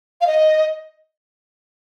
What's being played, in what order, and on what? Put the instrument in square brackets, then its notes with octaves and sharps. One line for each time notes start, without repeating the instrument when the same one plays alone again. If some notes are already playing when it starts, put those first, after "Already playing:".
[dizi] F5
D#5